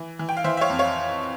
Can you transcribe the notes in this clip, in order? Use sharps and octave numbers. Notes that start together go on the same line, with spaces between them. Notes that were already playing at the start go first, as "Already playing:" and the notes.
Already playing: E3
E3
G5
F5
E3 C5 E5
E5
C#5 F5
F2
C#5 F5